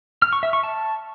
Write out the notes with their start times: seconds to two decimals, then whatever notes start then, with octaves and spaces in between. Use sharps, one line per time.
0.22 F6
0.33 C#6
0.43 E5
0.53 C#6
0.63 A5